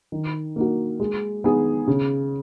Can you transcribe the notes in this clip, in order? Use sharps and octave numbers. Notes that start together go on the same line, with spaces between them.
D#3
A#3 D#4 F#4
G#3
B3 D#4 G#4
C#3